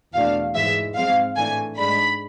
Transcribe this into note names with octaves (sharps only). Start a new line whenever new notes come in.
E2 B2 A3 D4 F5
G#2 E3 G#3 E5
G#2 F3 G#3 C4 F5
A2 E3 A3 D4 G#5
G#2 G#3 D4 B5